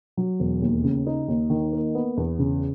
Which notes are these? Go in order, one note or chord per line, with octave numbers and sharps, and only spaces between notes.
F#3
E1
D#2
C#3
D#4
D#2
D#3
A#3
B3
E2
C#3